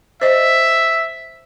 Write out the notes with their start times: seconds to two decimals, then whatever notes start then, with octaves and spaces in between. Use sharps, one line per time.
0.21 C5 D#5 E5